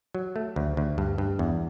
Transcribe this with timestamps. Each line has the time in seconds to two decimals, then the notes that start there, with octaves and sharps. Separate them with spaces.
0.15 F#3
0.36 A3
0.56 D2
0.77 D2
0.98 G2
1.18 G2
1.39 E2